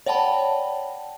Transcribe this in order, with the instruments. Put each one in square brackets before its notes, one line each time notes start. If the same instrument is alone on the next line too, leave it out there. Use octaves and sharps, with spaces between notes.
[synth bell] C#5 D5 F#5 G5 A5 B5